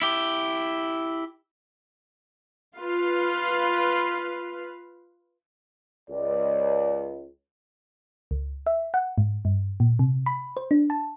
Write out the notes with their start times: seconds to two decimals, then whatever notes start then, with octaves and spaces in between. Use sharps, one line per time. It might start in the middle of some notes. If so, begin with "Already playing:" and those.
0.02 E4 G4
2.77 F4 B4 F5
6.10 C#2 D5
8.31 C#2
8.67 E5
8.94 F#5
9.18 G#2
9.45 G2
9.80 A#2
9.99 C3
10.26 B5
10.57 C5
10.71 D4
10.90 A5